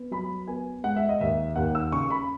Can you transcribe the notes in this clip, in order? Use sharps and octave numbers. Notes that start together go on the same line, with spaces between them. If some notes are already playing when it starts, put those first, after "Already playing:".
Already playing: B3
F#3 B5
B3 G#5
G#3 F#5
E5
D#5
D#2 E5
D#2 F#5
E6
C#3 C#6
B5